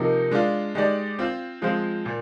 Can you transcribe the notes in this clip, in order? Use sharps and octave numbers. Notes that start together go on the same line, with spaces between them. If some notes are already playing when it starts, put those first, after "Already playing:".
Already playing: C3 F3 A#3 D#4
G#3 D4 F4
G#3 D#4 G4 D5
C4 F4 C5
F3 G#3 C4 F4 C5
A#2